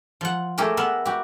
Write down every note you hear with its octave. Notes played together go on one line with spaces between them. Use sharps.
F3 F#5
A3 G4 G#4 A#4
B3 A#4 E5 F#5
F#4 G4